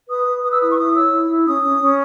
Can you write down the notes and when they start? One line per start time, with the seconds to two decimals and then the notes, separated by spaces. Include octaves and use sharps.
0.09 B4 D#6
0.27 B4
0.44 B4 D#6
0.53 E6
0.61 E4 D#6
0.69 C#6
0.78 E4 D#6
0.95 C#5 E6
1.12 E4
1.30 E4
1.47 C#4 D#6
1.64 C#4
1.81 C#4